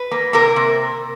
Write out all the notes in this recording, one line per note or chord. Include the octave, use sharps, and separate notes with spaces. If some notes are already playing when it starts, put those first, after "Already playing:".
Already playing: B4
A#3
C3 A#3 A#4
C3